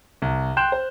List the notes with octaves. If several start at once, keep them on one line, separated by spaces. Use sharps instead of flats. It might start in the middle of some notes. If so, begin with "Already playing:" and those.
C2
G5 C6 F#6 G6 E7
C5